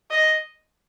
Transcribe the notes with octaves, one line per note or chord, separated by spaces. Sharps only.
D#5